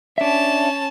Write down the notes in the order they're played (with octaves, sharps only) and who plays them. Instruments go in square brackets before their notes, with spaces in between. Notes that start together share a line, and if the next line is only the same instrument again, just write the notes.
[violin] C#4 A5 [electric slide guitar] D4 E5